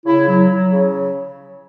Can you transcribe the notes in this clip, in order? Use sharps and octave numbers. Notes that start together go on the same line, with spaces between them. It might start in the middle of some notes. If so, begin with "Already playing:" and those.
C#3 E4
F#3
F#3
C#3